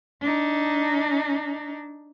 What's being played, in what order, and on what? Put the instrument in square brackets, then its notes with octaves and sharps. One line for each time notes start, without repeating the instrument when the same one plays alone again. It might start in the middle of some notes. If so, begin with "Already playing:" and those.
[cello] D4 D#4